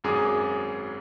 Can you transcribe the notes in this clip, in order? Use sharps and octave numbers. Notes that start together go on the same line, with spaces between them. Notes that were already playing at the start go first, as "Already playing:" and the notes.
G#1 F#2 G#4 D6 D#6